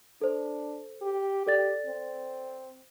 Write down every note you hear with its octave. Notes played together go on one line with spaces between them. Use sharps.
D4 A4 C5
G4
G4 A4 D5 A6
C4